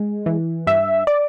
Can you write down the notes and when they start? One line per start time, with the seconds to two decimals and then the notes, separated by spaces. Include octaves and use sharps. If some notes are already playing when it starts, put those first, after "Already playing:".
Already playing: G#3
0.26 E3
0.67 G2 E5
1.07 D5